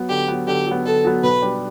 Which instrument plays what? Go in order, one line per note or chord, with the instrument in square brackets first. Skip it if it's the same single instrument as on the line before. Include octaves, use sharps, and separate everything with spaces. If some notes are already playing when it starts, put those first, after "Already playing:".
Already playing: [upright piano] F#3 B3
[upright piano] D3 [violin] G4
[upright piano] F#3 B3
[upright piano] D3 [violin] G4
[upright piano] F#3 B3
[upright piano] D3 [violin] A4
[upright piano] F#3 B3
[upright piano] B2 [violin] B4
[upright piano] G3 D4 G4